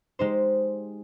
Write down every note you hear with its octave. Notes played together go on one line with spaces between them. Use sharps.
G#3 D#4 G4 C5